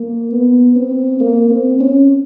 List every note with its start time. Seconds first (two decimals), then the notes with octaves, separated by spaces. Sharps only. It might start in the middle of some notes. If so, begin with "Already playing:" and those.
Already playing: A#3
0.32 B3
0.76 C4
1.21 A#3
1.50 C4
1.80 C#4